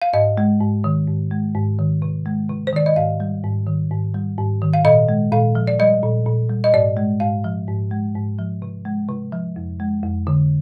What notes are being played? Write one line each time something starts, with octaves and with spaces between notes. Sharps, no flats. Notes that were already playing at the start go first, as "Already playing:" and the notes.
F5
G#2 D#5
G#3
G#2
D#3
G#2
G#3
G#2
D#3
C3
G#3
C3
C5
D#3 D5
D#5
G#2 F5
G3
G#2
D#3
G#2
G3
G#2
D#3
F5
A#2 D#5
G#3
A#2 F5
F3
D5
G3 D#5
A#2
A#2
G3
D#5
G#2 D5
G#3
G#2 F5
F3
G#2
G#3
G#2
F3
C3
G#3
C3
F3
F2
G#3
F2
D3